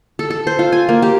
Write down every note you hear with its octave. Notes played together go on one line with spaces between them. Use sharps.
A4
A4
C5
F4
G#5
A#3
G4